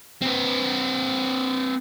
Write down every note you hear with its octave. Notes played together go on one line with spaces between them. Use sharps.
C4 B4